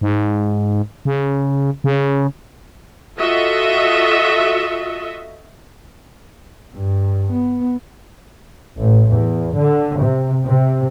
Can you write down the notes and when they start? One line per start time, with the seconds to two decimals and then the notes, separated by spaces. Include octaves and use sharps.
0.01 G#2
1.05 C#3
1.84 C#3
3.18 F4 F#4 A4 D#5 E5
6.75 G2
7.32 B3
8.79 A1
9.13 E2
9.55 D3
10.01 C3
10.46 C3